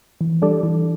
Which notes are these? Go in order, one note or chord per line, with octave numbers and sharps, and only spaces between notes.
E3
G3 D4 A4 D5
E3